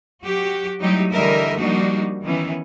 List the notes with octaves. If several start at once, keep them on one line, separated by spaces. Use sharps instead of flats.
F#3 F#4 G4
F#3 G3 A3 D#4 E4 G4
D3 E3 G3 A#4 D#5 E5
F3 G3 A#3 D4 D#4 F#4
D#3 E3 B3 C#4